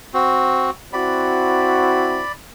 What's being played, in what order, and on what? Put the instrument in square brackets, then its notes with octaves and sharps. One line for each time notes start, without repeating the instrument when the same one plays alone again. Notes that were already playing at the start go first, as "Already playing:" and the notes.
[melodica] C4 F#4
[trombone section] C4 E4 F#4 [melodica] D5 B5